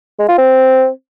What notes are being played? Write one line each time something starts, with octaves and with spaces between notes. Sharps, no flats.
G#3
F4
C4